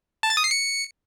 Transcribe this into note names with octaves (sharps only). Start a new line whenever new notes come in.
A5
A6
D#6
C7
C#7